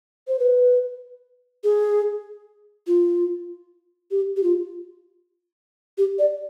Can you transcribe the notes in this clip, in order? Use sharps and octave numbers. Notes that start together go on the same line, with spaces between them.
C5
B4
G#4
F4
G4
G4
F4
G4
D5